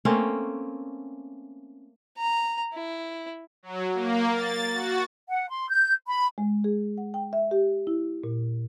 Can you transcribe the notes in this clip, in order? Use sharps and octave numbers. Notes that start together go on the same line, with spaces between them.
A3 A#3 C4 C#4
A#5
E4
F#3
A#3
A6
F#4
F#5
C6
G6
B5
G#3
G#4
F#5
G5
E5
G4
E4
A#2